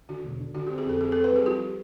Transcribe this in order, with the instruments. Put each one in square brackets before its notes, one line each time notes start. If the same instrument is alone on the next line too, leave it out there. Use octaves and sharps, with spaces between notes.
[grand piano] D3 [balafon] F#4
[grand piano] E1
D3
[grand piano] D3 [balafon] F#4
[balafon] G4
[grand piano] C4
[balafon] G#4
[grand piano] F2 [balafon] A4
[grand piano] C4 [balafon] G#4
[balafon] A4
[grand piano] C4
[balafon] B4
[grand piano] G3 [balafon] G#4
[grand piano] F3 [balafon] G4